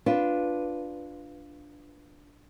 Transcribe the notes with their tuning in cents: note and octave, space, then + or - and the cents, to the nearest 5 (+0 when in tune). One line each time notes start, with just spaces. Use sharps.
D4 +0 F4 +0 B4 +0